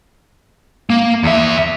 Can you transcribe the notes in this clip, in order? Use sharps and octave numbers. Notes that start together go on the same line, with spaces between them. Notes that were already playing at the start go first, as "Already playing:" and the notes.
A#3
E2 E5